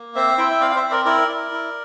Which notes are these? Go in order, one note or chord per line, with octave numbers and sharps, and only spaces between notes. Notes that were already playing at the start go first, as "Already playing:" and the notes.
Already playing: A#3
C4 C5 E5
E4 E5 G5
E5
C4 D5 F5
F5
C5 E5
C4
A#4 D5
E4 A#4 D5
E4
E4